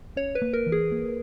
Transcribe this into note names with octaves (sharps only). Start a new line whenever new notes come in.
C#4 C#5
B4
A#3
A#4
E3
G#4
A#3